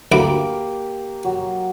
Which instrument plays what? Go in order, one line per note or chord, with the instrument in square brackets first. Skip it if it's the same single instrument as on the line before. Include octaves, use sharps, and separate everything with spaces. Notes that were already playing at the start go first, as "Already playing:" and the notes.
[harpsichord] D2 B5 D6 [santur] A#3 G4
[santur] F#3